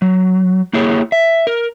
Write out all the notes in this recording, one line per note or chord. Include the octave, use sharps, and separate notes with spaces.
F#3
A#3 E4 G4 G#4 C#5
E5
A#4